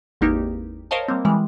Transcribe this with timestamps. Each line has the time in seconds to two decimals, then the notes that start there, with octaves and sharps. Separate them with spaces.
0.21 G#1 E2 A#3 D#4 G4
0.91 A#4 C5 C#5 D#5 F5 A5
1.08 G3 A#3 C4
1.25 E3 G3 G#3